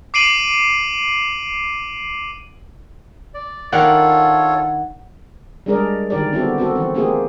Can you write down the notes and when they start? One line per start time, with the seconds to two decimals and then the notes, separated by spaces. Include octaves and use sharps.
0.14 D6 C7 D7 D#7 F#7
3.34 D5
3.72 D#3 D4 F4 A4 A#4 C#5 F#5
5.66 G3 G#3 D4 G#4 A#4 D5
6.10 D3 D#3 G4 A#4 D5
6.33 B3 C4 E4 F#4 G4 A4
6.58 C4 F#4 A4
6.75 E3 C4
6.94 A3 A#3 C4 F4 G4 G#4